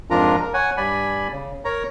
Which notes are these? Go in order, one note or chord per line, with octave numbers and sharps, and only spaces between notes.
F2 G#2 D4 F4 A#4 A#5
A#4
C#5 F#5 G#5
G2 D5 G#5 B5
C#3
A#4 C#5 A#5